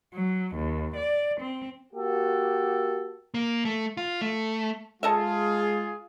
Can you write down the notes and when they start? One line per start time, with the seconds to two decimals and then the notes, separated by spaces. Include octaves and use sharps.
0.13 F#3
0.54 D#2
0.95 D5
1.39 C4
1.93 A#3 F#4 G4 A4
3.34 A#3
3.65 A3
3.97 F4
4.21 A3
5.03 G#3 F4 G#4 A4 D#5 E5